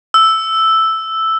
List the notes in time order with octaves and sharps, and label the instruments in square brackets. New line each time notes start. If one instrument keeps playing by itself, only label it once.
[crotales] E6